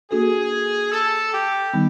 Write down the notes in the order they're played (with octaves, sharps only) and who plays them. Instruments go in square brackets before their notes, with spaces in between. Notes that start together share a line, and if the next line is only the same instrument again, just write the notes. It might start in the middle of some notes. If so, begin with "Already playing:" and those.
[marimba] A#3 D4 F#4 A4 [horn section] G#4
[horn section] A4
G4
[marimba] D#3 G3 B3 D#4